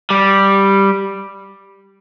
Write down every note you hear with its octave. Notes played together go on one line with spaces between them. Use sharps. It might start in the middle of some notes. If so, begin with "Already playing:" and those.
G3